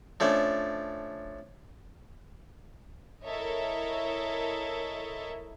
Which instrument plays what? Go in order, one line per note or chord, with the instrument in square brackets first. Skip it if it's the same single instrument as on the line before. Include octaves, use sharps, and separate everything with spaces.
[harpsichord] F3 A3 C#4 D4
[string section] E4 A4 A#4 C#5 D#5 E5